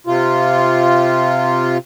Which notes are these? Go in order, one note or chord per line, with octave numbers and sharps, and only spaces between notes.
C3 F4